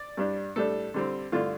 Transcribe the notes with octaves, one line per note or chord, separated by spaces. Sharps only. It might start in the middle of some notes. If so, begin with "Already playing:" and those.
Already playing: D5
G2 G3 D4
A2 G3 D4 A4
D3 G3 C4
G2 D3 A3 D4 F4